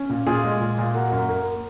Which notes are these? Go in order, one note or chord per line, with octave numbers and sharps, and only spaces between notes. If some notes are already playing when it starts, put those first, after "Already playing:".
Already playing: C#4
A#2
A#2 F4 G#4
G#3
A#2
A#2
A#3 F#4
F#2
A#3